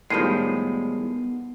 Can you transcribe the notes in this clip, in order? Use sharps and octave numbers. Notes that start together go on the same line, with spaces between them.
A2 D#3 F3 G3 G#3 B3 C7 D#7